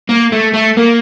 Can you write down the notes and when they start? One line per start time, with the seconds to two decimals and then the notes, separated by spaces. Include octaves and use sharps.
0.09 A#3
0.32 A3
0.54 A3
0.77 A#3